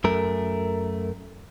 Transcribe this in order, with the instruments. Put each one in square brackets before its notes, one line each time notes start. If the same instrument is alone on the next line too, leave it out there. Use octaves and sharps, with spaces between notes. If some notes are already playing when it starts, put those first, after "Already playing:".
[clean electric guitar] F#2 A3 A#4